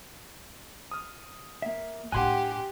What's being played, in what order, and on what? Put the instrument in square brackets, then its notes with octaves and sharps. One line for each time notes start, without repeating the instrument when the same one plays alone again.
[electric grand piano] D#6 F6
[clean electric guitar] A#3 E5
[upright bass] A2 D4 [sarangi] G4 [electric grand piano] F#5 C6 F#6 [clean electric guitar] G#5